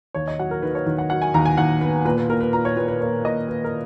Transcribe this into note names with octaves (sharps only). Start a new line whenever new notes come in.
D#2 C#5
D#5
F#3 F#5
A#4
D#3 B4
C#5
D#3
F#5
F#3 F#5
G#5
D#2 A#5
G#5
D#2 F#5
B3 B4
A#2 B4
B4
A#2 A#4
B4
A#2 A#5
C#5
A#2 B4
B4
A#3 C#5
A#2 D#5
A#3 B4
A#4